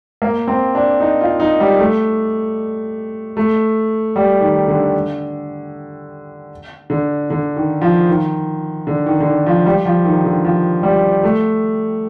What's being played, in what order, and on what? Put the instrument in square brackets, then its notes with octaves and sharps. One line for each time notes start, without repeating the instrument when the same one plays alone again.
[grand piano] A#3
C4
D4
D#4
F4
D#4
G3
A3
A3
G3
D#3
D3
D3
D3
D#3
F3
D#3
D3
D#3
D3
D#3
F3
G3
F3
D#3
D3
F3
G3
A3